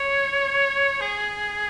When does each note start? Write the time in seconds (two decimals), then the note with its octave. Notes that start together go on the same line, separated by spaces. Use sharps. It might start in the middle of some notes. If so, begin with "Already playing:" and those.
Already playing: C#5
1.01 G#4